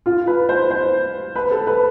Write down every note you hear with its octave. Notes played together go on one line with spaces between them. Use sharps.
F4
B4
C5
C5
B4
A4
B4